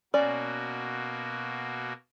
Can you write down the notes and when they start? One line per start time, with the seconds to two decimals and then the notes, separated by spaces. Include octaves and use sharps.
0.14 B2 A#3 C#4 F#4 D5